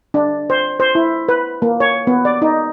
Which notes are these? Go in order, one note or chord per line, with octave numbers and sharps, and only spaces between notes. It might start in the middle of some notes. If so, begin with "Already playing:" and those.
D4
C5
C5
E4
B4
A#3
C#5
B3
D5
D#4